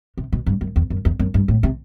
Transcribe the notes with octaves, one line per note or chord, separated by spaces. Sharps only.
C3
B2
G2
F#2
E2
F#2
E2
F#2
G2
A2
C3